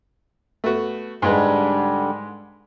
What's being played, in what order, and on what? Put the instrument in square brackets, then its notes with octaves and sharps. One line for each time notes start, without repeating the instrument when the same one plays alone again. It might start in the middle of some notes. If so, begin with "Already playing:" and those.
[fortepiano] A3 B3 F#4
[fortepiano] G#2 G#3 B4 [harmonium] D3 G3